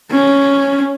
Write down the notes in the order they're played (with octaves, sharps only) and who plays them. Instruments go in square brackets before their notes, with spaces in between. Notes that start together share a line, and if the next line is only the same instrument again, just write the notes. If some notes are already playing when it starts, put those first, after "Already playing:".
[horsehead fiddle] C#4